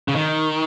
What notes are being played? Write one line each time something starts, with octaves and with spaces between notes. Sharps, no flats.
C#3
D#3